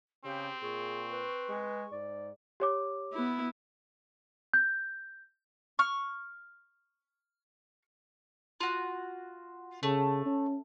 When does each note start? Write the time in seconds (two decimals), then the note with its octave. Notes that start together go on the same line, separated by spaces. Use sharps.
0.25 C#3 C4 G4
0.62 A#2 G#4 C#6
1.12 B4
1.49 G#3
1.92 G#2 D5
2.60 G4 C#5 D6
3.13 B3 E4
4.54 G6
5.79 C#6 F6
8.60 F4 F#4
9.83 C#3 A3
10.25 C#4